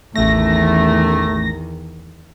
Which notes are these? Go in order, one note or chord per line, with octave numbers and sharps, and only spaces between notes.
A1 E2 D#3 A3 A#6